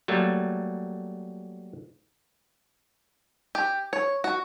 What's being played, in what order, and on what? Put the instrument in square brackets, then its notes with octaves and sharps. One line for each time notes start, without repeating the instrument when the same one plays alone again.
[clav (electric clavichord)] F#3 G3 A3 A#3
[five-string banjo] G4
C#5
F#4